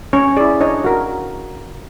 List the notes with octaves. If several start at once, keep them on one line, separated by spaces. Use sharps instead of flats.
C#4 C#5
E4 G#4 D5
D4 C#5 D#5
F#4 A#4